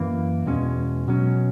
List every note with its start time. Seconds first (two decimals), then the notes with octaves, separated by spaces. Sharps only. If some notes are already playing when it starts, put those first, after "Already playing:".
Already playing: F#2 E3 A#3
0.46 E2 B2 G#3 C#4
1.08 B2 F#3 C#4